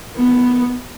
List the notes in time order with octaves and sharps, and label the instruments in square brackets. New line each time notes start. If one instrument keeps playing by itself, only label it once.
[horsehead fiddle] B3